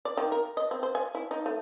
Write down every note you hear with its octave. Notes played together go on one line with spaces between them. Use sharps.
D5
D#3
A#4
D#5
C4
C5
G#5
E4
D#4
A3